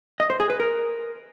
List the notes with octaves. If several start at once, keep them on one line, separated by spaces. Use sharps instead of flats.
D#5
C5
G#4
B4
A#4